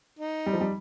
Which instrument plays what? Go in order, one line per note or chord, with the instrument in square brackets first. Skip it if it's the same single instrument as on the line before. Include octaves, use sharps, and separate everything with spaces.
[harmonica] D#4
[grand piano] G3
F3
G3